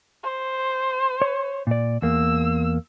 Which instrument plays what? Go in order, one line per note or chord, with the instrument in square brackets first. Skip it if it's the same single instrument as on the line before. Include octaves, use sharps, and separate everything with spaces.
[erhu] C5
[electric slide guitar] C#5
A#2 D5
[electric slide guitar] E2 A#3 [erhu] E6